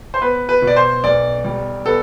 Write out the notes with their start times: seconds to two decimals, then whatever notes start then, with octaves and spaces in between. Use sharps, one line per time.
0.14 C5
0.22 B3 B4
0.49 B4
0.62 B2
0.67 D5
0.76 C5
1.04 B1 D5
1.45 G3
1.86 B3 A4